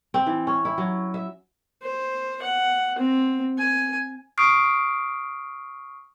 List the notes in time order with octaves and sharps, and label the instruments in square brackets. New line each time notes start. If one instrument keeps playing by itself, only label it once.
[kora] C4
E3
C#4
E4
F#3
E5
[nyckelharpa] C5
F#5
C4
G#5
[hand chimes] C#6 D#6 F6 C7 D7